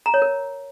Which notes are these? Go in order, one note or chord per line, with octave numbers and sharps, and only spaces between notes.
A#5
C#5
A#4